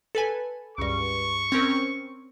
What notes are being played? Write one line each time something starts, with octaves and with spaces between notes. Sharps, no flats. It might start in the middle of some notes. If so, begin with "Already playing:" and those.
A4 B4 G#5
C#2 G2 C#6
C4 C#4 A#4